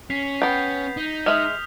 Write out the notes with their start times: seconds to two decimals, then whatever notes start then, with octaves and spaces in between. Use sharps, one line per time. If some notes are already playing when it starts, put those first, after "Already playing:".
0.10 C#4 B6 C7 F7
0.42 B3 G5 G6
0.97 D#4
1.26 G#3 E5 D#6 F6 F7